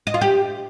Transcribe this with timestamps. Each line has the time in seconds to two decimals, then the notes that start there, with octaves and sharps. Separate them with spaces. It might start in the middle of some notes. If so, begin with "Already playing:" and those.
0.07 D#5
0.14 F4
0.21 G4